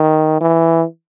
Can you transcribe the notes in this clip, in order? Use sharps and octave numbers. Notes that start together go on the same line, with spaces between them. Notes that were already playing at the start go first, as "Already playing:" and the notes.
Already playing: D#3
E3